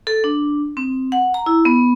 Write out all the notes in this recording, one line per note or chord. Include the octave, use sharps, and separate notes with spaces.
A4
D4
C4
F#5
A#5
E4
B3